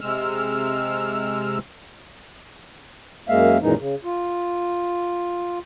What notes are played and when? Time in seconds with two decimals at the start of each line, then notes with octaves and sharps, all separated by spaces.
0.01 C3 G#3 E6 F6
3.29 F#2 G#3 A#3 E5 F5
3.62 F#2 A#2 D#3 E3 G#3 D#4
3.79 C#3
4.04 F4